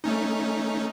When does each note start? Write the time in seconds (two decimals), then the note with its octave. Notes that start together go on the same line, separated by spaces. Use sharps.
0.04 A3 C#4 D#4